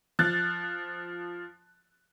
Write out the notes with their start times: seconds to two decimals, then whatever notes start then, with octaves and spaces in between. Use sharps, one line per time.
0.19 F3 F#6 A6